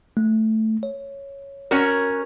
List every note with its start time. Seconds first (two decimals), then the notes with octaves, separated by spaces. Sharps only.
0.17 A3
0.83 C#5
1.71 C#4 F#4 A#4